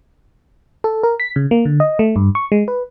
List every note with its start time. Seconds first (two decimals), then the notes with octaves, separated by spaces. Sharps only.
0.84 A4
1.03 A#4
1.20 B6
1.36 C#3
1.51 A#3
1.65 D3
1.80 D#5
1.99 A3
2.16 G2
2.35 C#6
2.52 G#3
2.68 B4